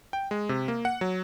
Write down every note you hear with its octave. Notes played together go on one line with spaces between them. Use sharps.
G5
G#3
C3
A#3
F#5
F#3